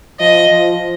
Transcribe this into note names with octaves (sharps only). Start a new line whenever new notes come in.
F3 D#5
F3